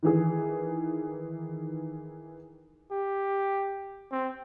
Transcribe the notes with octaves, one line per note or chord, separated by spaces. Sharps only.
D#3 E3 G#4
G4
C4